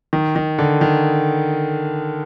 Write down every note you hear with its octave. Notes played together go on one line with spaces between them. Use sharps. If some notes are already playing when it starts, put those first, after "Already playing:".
D#3
D#3
D3
D#3